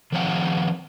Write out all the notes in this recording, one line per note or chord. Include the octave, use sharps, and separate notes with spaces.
D#3 F3 C4 C#5 F5 F#5